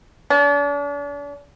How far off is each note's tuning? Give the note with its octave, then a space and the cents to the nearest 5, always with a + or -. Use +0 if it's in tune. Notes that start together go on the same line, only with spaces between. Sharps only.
D4 -40